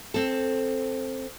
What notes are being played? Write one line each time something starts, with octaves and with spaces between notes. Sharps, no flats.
C4 A4